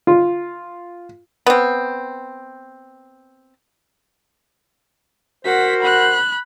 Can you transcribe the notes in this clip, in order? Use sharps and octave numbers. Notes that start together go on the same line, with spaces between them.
F4
B3 C4
F#4 A#4 C5 F#5 B6
B5 F#6